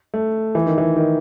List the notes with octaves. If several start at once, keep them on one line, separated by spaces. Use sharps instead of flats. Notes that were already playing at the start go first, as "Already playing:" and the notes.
A3
E3
D#3
E3
D#3